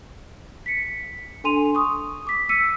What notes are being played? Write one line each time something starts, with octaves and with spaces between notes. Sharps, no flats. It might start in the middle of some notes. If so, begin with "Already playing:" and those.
B6 C#7
D4 A4 G#5 C6 D#7 F7
C#6 D#6
D6 B6
E6 B6 C#7 D#7